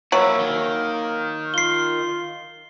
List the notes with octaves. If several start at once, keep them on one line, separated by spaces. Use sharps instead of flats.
F#3 A#3 C#4 E4
D#3
F4 C7 G7